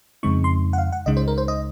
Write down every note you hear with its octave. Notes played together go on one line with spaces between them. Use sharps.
F2 C#3 G#3 C4 D#4 C#6
C6
F#5
F5
F#5
C#2 C#3 G#3 D#4 D#5
C5
A#4
C5
D#5